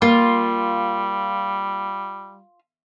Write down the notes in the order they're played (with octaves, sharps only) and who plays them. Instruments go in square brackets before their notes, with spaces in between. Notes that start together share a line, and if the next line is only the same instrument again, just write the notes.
[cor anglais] G3 [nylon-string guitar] A#3 [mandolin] F4